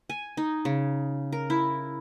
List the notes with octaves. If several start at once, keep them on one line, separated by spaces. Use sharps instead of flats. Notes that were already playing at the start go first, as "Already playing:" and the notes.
G#5
D#4
C#3
A#4
E4